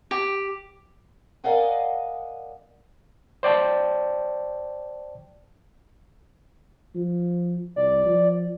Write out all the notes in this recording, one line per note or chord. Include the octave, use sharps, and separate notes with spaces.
G4
A#4 D5 D#5 F5 F#5 G#5
C5 D5 G5 A5
F3
C2 D5
F3